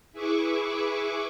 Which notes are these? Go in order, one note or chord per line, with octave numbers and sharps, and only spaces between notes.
E4 G#4 B4 E5 C#6 D6